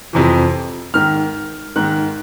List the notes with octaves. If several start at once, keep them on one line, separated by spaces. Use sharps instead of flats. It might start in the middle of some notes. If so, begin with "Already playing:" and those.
F2 C3 E3
G#2 D#3 F6
G#2 D#3 F#6